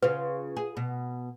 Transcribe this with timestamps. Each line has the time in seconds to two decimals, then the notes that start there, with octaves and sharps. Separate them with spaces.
0.03 C#3 F4 B4
0.57 G#4
0.77 B2